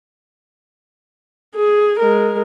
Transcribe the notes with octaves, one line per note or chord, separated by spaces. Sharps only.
G#4
G#3 A#4